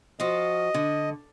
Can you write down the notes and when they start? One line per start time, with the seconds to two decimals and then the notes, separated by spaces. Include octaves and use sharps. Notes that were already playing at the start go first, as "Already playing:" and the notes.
0.20 F3 F4 F#4 D#5
0.74 D3